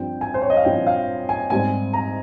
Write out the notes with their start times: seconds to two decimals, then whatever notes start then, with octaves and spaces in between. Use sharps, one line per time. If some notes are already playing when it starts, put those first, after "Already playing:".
Already playing: G2 F3 C4 F4 G5
0.21 G#5
0.34 C5
0.42 C#5
0.50 D#5
0.57 F5
0.65 G2 F3 C4 F4 G5
0.87 F5
1.29 G#5
1.50 G#2 G3 C4 G#5
1.93 A#5